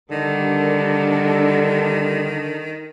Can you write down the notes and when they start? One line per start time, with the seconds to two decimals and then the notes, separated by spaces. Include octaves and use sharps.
0.11 D3 D#3 G3 D4 A4 A#4